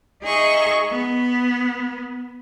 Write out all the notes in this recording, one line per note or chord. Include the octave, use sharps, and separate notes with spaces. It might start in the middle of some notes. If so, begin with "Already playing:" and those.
D#4 G#4 D#5 E5 C#6
B3